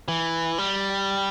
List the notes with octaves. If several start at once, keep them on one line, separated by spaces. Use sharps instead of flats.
E3
G3